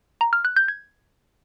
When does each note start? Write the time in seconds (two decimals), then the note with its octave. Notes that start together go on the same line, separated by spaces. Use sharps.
0.21 A#5
0.33 F6
0.45 F#6
0.56 G6
0.68 G#6